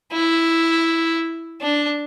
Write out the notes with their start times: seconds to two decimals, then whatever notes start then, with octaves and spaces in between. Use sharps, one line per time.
0.13 E4
1.61 D4